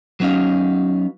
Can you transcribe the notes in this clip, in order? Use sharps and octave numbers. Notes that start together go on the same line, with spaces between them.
F#3 B3 C#4 D#4 F5